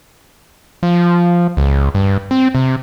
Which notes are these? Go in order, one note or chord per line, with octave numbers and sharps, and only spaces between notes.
F3
C#2
G2
C4
C3